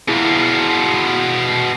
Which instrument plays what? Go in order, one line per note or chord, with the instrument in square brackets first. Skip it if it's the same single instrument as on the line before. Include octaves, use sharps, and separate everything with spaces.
[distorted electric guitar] B2 F4 [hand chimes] E4 G#4